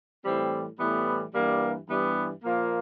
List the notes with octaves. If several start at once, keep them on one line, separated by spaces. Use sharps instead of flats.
A2 E3 G3 C4
A2 E3 G3 B3
G2 E3 G3 A#3
G2 E3 G3 B3
A#2 F3 A#3